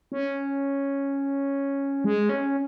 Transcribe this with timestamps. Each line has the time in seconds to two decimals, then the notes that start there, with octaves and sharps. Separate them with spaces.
0.12 C#4
2.04 G#3
2.29 C#4